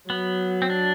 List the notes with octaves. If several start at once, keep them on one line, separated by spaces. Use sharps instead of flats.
F#3 B3
C4
D4